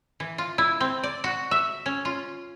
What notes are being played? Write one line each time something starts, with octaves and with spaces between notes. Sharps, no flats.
E3
F4
E4
C4
D5
F#4
E5
C#4
F4